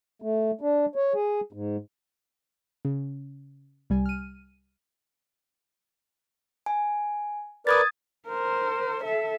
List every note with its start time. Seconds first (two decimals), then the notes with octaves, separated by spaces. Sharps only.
0.22 A3
0.61 D4
0.96 C#5
1.14 G#4
1.53 G#2
2.85 C#3
3.90 C2 G3 G#5
4.06 F6 D#7
6.66 G#5
7.67 A#4 B4 D5 D#6 G#6 A6
8.29 A#4 C5
9.04 A4 E5